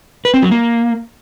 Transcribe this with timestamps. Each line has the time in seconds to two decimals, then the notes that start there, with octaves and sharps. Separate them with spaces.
0.25 B4
0.34 C4
0.42 F#3
0.51 A#3